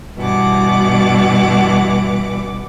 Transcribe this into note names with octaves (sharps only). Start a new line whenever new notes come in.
G2 B2 E3 F#5 D6